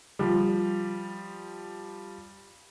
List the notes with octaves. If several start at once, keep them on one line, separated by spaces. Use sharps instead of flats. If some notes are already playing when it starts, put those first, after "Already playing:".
F3 G3